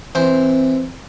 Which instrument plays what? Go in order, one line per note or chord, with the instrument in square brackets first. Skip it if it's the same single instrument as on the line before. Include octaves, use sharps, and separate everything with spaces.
[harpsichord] E3 [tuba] C4 [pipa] C5